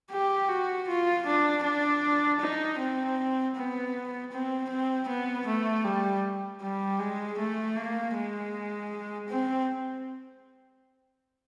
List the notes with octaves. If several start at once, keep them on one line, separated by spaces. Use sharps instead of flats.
G4
F#4
F4
D4
D4
D#4
C4
B3
C4
C4
B3
A3
G3
G3
G#3
A3
A#3
G#3
C4